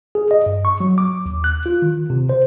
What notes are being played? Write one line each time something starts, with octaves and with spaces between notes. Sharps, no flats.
G#4
D#5
G2
C#6
F#3
D6
D#2
F#6
F4
D#3
C3
C5